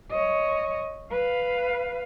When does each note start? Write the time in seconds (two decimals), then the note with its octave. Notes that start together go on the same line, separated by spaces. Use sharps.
0.11 C#5 D#5
1.11 B4 F5